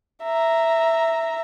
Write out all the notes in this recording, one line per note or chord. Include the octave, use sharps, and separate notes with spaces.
E5 A#5